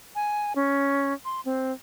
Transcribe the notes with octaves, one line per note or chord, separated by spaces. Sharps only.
G#5
C#4
C6
C4